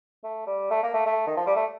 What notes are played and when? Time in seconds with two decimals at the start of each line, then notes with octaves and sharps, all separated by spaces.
0.24 A3
0.47 G3
0.71 A3
0.83 A#3
0.94 A3
1.06 A3
1.27 D#3
1.37 F3
1.47 G3
1.56 A3